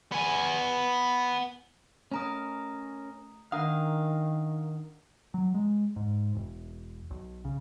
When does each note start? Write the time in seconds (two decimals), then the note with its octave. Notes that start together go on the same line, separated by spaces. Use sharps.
0.12 B3 G#5
2.12 A3 C#4 A#4 A#5 D#6
3.52 D#3 D4 A#4 F5 F#5 D#6
5.34 F#3
5.54 G#3
5.96 G#2
6.35 E1
7.11 B1
7.45 C#3